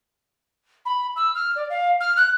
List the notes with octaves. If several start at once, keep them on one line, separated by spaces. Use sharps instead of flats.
B5
E6
F6
D5
F5
F6
F#6